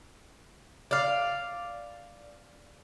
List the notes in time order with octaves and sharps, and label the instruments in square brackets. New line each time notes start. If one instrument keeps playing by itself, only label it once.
[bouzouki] D5 F5